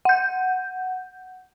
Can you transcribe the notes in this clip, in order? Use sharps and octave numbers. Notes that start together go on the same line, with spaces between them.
F#5 G6